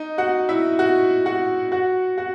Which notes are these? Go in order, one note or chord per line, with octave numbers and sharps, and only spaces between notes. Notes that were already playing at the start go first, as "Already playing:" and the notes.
Already playing: D#4 D#5
F#4 F#5
E4 E5
F#4 F#5
F#4 F#5
F#4 F#5
F#4 F#5